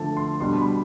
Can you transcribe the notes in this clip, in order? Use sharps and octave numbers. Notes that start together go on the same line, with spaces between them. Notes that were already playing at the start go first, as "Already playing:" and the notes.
Already playing: D3 F3 A3 A5
C6
B2 G3 D4 C6
B5